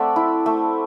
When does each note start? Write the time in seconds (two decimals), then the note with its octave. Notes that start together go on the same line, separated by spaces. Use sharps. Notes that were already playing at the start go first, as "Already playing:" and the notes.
Already playing: A3 C4 A4 D5 E5 F#5
0.16 E4
0.46 A3